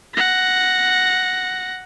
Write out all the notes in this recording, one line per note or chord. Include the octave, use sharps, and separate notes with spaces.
F#5 A#6